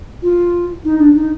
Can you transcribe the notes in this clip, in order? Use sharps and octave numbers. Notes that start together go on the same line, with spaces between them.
F4
D#4
D4
D#4